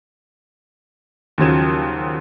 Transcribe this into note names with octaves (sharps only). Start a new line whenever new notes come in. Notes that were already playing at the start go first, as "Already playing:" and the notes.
D#2 C#3 F3 F#3 G#6 E7